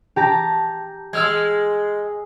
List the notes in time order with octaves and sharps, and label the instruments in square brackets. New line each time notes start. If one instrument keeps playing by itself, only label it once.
[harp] G4 A5 A#5
[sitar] G#3 [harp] E6 F6 G#6